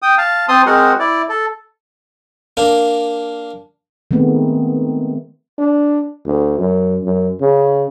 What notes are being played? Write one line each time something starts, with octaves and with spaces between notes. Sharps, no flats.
G5 D#6
F5 A5
C4 A5 C6 D#6
G#3 C4 F#4 A#4 F#5
E4 D5
A4
A#3 D4
D#3 G#3 A3 B3 C4
D4
D2
F#2
F#2
C#3